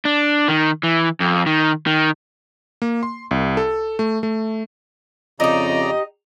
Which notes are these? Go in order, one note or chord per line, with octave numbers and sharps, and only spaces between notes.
D4
D#3
E3
F2
D#3
D#3
A#3
C6
C2
A4
A3
A3
F2 C#3 D#4 G4 D5 D#5 A#5